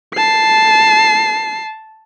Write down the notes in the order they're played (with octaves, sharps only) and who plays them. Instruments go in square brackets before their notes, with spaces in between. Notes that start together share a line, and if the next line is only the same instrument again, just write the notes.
[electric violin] A5 C7